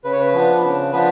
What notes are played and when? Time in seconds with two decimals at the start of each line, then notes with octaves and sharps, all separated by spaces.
0.04 C#3 B4
0.13 C#5
0.20 B4
0.34 F3 B3 D4
0.63 C#3
0.92 F3 B3 D4 B4